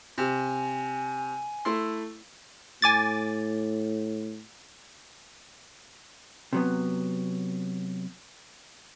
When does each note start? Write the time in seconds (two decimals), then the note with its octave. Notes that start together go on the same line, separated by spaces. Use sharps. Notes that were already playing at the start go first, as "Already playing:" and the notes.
0.18 C3 G#5
1.65 A3 E4 C6
2.82 A2 G#5 D6 A6
6.53 C3 F#3 B3